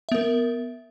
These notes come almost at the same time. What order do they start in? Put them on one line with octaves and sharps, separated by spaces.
E5 B3 A#4